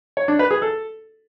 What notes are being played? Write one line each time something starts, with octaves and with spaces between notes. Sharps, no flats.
C#5
D4
B4
G#4
A4